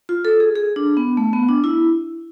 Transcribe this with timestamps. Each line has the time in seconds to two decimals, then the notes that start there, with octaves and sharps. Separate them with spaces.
0.09 F4
0.25 A4
0.40 G#4
0.55 G#4
0.76 D4
0.97 B3
1.17 A3
1.33 B3
1.49 D4
1.64 E4